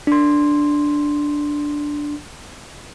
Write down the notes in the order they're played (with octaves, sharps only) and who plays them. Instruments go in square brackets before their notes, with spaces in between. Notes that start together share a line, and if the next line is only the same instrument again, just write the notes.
[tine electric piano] D4 C6